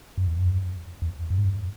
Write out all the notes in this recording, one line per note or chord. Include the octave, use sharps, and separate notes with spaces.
F#2
E2
F#2
E2
F#2
G#2
F#2